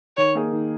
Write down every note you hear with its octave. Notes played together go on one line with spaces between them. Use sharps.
D#3 C#5
A#3 D#4 G#4
D#3